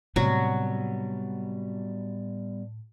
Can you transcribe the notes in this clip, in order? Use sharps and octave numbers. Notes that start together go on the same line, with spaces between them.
A2 C3 F#3 G3 B3 F#4